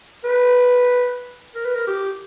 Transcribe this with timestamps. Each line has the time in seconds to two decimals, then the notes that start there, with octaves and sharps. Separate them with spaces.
0.24 B4
1.55 A#4
1.65 B4
1.75 A#4
1.87 G4